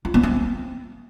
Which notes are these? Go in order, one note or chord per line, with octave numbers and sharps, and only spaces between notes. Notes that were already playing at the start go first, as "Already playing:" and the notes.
F4
B3
C4